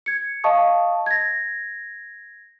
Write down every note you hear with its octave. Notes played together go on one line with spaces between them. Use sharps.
G#6 C#7
D#5 F5 A5 C#6 D#6
G#6 A#6